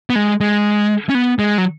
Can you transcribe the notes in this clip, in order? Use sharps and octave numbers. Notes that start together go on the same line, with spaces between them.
B3
G#3
G#3
C#4
B3
G#3
F#3